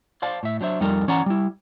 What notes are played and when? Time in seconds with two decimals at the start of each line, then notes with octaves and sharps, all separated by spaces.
0.22 C5 D5 F5 A5
0.43 A2 E5
0.61 F#3 D4 C5 E5
0.80 F2 G3 D#4 A4 A#4 D5
1.08 E3 C#4 D5 F#5 A#5
1.26 G3 E4